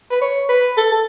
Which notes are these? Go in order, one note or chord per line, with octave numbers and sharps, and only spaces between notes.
B4
C#5
B4
A4
A4